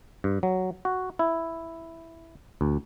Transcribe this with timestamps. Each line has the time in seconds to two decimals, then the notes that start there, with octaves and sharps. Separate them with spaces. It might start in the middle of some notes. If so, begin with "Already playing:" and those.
0.24 G2
0.43 F#3
0.85 F#4
1.19 E4
2.61 D2